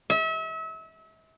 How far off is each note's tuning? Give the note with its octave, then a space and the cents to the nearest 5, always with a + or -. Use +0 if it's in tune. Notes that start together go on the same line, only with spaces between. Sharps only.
E5 -35